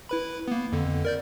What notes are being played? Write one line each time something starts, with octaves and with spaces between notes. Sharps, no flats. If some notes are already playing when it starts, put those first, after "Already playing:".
E4 B4 B5
A#3 B3
F2 D3
A#4 D5 G6